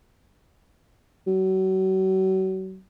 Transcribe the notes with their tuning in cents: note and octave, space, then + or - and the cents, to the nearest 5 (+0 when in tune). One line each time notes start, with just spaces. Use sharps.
F#3 +35